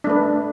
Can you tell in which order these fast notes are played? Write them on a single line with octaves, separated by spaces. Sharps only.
D4 A3 B4